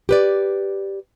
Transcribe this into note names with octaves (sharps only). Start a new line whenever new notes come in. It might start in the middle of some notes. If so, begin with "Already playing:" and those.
G4 B4 D5